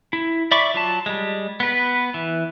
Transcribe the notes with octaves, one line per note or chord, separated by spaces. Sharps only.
E4
D5 E5 B5 C#6 D6
F#3 F4 A5
G3 G#3
B3 B4
E3